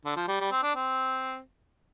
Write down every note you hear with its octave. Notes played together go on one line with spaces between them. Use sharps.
D3
F3
G3
G3
C4
D4
C4